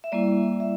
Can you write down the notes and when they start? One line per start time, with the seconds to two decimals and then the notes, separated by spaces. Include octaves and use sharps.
0.04 E5
0.12 G3 A#3 E4 D5
0.60 E5